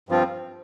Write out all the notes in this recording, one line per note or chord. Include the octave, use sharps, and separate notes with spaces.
G2 F3 C4 F4